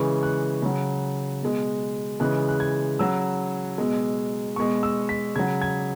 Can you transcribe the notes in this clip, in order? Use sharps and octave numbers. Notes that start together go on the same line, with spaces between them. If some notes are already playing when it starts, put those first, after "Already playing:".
Already playing: C#3 E3 G#3 C#6
F#6
C#3 F#3
B2 G#3
C#3 E3 G#3 F#6
F#6
G#6
C#3 F#3 E6
B2 G#3
B2 G#3 C#6
E6
B6
C#3 F#3 G#6
G#6